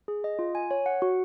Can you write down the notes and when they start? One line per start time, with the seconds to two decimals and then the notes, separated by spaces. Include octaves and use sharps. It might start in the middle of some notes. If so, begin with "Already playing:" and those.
0.08 G#4
0.24 D#5
0.39 F4
0.55 G#5
0.71 C#5
0.86 F#5
1.02 F#4